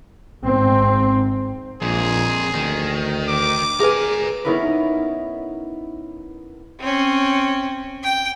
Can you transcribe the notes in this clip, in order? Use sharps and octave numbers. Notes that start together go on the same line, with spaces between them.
G#1 G#2 C4
A#1 F2 A#2 G#4
D2 D#3
D6
G#4 A#4 B4 G#5
B3 C#4 D#4 E4 A#4 B4
C4 C#4
G5